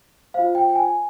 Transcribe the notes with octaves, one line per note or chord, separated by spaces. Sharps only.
F4 C5 F5
G5
G5
G#5